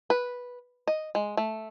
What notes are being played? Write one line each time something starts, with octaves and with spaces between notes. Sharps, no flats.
B4
D#5
G#3
A3